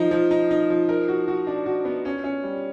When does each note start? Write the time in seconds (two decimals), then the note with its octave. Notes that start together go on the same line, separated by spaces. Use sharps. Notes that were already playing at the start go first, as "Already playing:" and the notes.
Already playing: F3 D#4
0.11 F3
0.31 D#4
0.51 D#4
0.70 F3
0.89 A#4
1.08 F#4
1.28 F#4
1.47 D4
1.66 F#4
1.85 B3
2.05 C#4
2.24 C#4
2.44 G3